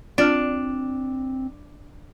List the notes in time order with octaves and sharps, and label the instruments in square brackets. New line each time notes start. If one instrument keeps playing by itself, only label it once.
[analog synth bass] C4 [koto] D4 [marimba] F4 D5 F6